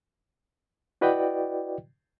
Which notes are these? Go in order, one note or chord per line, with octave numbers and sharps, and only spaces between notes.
E4 F#4 B4 D5 D#5 G5